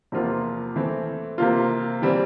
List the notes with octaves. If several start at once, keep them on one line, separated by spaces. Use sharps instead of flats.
E2 C3 F3 A#3 F4
E3 A3 C4
C3 E3 A#3 F4
E3 G3 C4